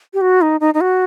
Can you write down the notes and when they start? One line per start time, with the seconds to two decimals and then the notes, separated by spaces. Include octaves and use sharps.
0.14 G4
0.21 F#4
0.42 D#4
0.60 D#4
0.74 D#4
0.81 F#4